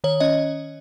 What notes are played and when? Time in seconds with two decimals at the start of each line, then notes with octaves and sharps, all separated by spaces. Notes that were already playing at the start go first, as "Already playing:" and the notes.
0.04 D#3 C#5
0.20 C#4 D#5